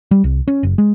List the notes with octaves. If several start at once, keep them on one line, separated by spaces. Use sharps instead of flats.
G3
C2
C#4
F#1
G#3